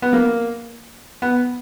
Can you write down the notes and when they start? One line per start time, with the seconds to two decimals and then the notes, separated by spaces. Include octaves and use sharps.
0.02 B3
0.13 A#3
1.22 B3